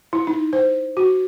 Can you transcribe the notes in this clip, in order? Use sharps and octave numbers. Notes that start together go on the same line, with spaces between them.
E4
D#4
C5
F#4